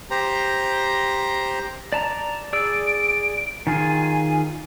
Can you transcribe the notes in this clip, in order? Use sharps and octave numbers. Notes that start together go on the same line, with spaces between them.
G4 C5 A#5
D5 A5 A#5
G#4 D5 E6 D7
D#3 F4 G#4 G#5